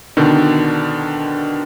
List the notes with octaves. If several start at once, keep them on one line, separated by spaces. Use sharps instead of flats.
B2 D3 D#3